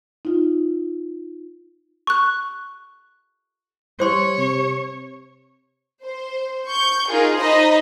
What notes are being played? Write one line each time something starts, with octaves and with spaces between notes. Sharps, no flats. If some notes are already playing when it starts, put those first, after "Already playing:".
D#4 F4
C#6 F#6
G3 C5 C#5 C6 C#6
C3
C5
C#6 G6
D#4 F4 G#4 A#4
D#4 C5 D#5 B5